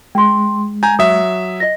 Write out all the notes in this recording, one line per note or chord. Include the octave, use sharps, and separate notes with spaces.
G#3 G5 C6
G#5 A#5 G6
F#3 E5 D#6
D#5 A#6